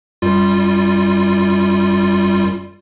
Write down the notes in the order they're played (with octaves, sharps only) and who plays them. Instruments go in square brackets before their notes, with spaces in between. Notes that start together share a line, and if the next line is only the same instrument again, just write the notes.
[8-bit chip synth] F#2 G3 F4